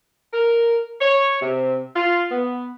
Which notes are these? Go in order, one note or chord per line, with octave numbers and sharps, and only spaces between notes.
A#4
C#5
C3
F4
B3